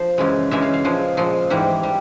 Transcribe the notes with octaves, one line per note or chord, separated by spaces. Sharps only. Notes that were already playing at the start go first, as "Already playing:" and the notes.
Already playing: F3 C5
F#2 C#3 E3 G#3
F#2 C#3 E3 G#3 E5
F5
F5
A#2 F3 G#3
A#2 F3 G#3
G#2 E3 G3 F#5
G3